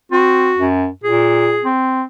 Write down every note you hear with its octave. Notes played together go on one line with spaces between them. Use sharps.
C4 F#4
F#2
A#2 G#4
C4